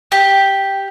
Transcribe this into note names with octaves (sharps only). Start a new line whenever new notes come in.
G4